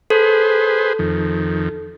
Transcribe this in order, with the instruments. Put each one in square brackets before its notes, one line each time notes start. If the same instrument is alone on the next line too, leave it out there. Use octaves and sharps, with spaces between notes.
[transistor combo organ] G#4 B4 C5 [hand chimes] A4
[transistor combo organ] F2 D#3